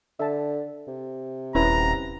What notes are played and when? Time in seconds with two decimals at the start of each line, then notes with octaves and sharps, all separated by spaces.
0.20 D3 E5 A5
0.88 C3
1.55 D#1 C#4 E4 B4 A#5